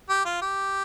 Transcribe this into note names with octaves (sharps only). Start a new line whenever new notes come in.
G4
F4
G4